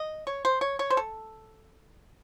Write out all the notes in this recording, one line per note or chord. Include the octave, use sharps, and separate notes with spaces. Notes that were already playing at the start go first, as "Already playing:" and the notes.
Already playing: D#5
C#5
C5
C#5
C#5
C5
A4